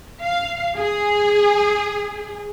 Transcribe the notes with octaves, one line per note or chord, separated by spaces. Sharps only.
F5
G#4